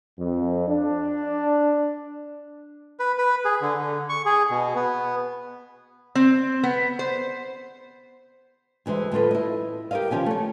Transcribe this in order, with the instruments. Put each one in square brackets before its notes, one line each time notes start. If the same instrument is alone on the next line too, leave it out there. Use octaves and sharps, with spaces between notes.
[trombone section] F2
D4
[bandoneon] B4
B4
G#4
D3
D3
C#6
G#4
B2
B3
[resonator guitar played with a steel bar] C4
B3
C5
[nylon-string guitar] D2 E3 G#3 C5 E5
A2 F#3 F4 A4 B4
E4 D#5
G4 A#4 B4 D#5 F5
D#3 F3 C#4 G4 G#5
A3 C#5